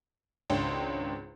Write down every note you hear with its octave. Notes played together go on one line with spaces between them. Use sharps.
G#1 C#2 D4 C#5 G5 C6